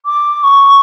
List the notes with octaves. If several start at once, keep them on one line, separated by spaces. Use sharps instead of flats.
D6
C#6